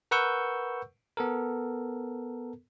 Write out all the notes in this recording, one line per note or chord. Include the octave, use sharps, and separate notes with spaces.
A#4 B4 F#5 C#6 E6 G6
B3 A4 A#4